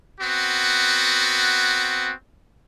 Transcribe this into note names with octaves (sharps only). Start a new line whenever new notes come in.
B3 C4 F#4